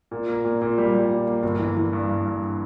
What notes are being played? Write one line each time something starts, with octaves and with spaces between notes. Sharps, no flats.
A#2
A#3
A#2
A#2
G3
G3
A#2
A#3
G1
E3
E3
G2
G2
G2